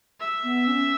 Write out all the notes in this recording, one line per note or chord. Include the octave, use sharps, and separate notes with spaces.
E5
B3
C#4